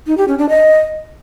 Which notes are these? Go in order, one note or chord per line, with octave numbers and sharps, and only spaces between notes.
D#4
G4
C#4
D4
D#5